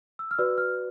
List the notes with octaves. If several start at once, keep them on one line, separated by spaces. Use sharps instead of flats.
E6
F6
F#4 B4 D5 E6
F6